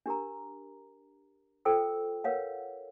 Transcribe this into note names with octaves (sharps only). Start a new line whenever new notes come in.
D4 G4 A#4 A#5
F4 A4 C5 G5 E6
A#4 B4 C#5 F5 F#5